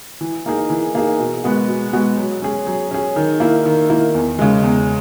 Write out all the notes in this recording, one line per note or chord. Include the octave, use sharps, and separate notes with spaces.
E3
A#3 D#4 G#4
E3
A#3 D#4 G#4
B2
G#3 B3 F#4
B2
G#3 B3 F#4
F#3
C#4 G#4
F#3
C#4 G#4
D#3
A#3 E4
D#3
A#3 E4
E2
C#3 G#3
E2